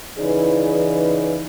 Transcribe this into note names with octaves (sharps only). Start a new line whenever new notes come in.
C#3 E3 D#4 G#4 B4 D5